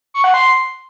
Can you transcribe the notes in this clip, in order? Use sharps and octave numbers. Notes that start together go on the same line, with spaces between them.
C#6
F#5
C6